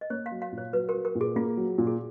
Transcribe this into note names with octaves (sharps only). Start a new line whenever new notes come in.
D#5
A#3 C#5
F5
F#3
F5
A#2
C#5
F#3 B4
A#4
F#3
A#4
A#2
G#4
A#3 F4
F#3
A#2
G#4